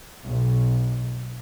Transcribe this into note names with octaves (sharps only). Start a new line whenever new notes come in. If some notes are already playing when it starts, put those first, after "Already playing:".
B1